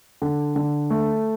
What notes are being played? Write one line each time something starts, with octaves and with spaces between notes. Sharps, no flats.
D3
D3
A3